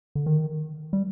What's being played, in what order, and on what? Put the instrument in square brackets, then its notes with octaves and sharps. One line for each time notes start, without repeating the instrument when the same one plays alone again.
[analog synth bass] D3
D#3
G3